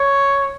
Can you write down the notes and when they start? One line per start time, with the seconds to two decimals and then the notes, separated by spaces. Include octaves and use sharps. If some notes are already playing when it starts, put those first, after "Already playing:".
Already playing: C#5